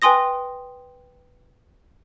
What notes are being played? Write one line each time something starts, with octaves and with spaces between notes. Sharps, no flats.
B4 G5 G#5 C6 D#6 A#6